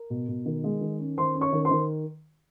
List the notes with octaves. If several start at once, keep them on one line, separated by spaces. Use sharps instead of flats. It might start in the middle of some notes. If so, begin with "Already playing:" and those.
Already playing: A#4
B2
B2
D#3
G#3
D#3
C#4
D#3 C5 C6
C#4
C#5 C#6
D#3
C5 C6
D#3